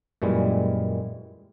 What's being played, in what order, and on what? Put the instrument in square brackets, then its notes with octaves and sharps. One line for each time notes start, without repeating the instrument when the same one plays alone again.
[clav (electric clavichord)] F#2 A#2 E3 G3 G#3